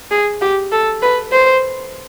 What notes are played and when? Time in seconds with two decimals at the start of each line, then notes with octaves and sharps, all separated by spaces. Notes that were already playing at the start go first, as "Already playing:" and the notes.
0.11 G#4
0.41 G4
0.72 A4
1.02 B4
1.32 C5